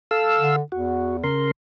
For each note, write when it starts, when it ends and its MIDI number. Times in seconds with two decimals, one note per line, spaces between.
0.11 0.56 69
0.11 0.56 77
0.11 0.56 88
0.39 0.61 50
0.72 1.26 40
0.72 1.17 66
1.24 1.51 49
1.24 1.51 70
1.24 1.51 84